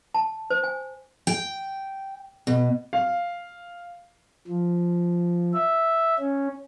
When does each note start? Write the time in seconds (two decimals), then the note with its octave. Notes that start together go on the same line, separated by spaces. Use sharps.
0.14 A5
0.50 C5
0.64 G#5
1.27 G5
2.47 B2
2.93 F5
4.48 F3
5.54 E5
6.19 C#4